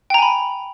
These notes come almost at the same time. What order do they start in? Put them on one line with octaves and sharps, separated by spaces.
G5 A#5 G#5 B5